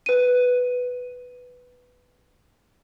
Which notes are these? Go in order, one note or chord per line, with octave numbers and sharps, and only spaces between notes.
B4 D#7